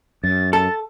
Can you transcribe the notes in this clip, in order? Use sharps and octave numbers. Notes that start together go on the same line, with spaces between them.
F#2 A6
A4 A6